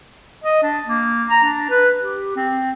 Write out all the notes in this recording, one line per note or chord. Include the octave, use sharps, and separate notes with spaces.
D#5
D4
A#3
A#5
D4
B4
G4
C4